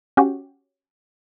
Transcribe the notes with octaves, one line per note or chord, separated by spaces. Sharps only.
C#4 F#4 G4